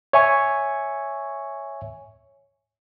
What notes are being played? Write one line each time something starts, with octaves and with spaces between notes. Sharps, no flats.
C#5 E5 G#5 C#6